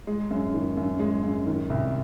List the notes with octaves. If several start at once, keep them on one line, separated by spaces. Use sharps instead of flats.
G#3
F#2
D#3
F#2
G#3
F#2
D#3
C2